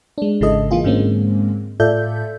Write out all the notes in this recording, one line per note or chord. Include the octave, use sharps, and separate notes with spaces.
G#3 D4
G#1 C#3 G#3 E4 A4 D#5
E3 A#3 F4 G#4
G#2 D3 G#3 A#3 C4 C#4
A2 F4 A4 D5 E5 G6